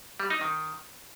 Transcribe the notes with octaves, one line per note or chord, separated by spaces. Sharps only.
G3
D#4
D#3